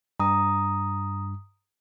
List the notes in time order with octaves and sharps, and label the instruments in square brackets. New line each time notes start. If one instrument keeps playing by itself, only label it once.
[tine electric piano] G2 [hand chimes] A#5 D#6